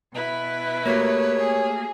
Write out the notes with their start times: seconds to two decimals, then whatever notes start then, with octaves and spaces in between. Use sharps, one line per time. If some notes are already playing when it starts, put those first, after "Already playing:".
0.13 B2 E4 B4
0.86 A3 A#3 F#4 G4 C#5 D#6
1.39 G#4